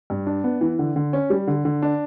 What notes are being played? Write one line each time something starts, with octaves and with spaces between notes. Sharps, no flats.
G2
D4
B3
E3
D3
D3
C#4
G3
D3
D3
D4